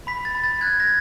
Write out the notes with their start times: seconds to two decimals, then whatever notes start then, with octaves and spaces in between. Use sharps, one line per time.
0.07 B5 B6
0.25 A6
0.35 B5
0.44 A6
0.61 F#6 G#6
0.80 A#6